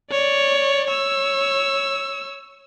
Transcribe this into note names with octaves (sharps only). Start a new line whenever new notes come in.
C#5 D5
C#5 E6